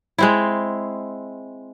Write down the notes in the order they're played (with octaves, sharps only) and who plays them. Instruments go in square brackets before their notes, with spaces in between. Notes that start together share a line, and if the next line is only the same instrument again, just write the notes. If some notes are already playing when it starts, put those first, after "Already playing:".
[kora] G#3 C4 E4